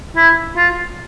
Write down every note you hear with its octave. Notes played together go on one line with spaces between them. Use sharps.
E4
F4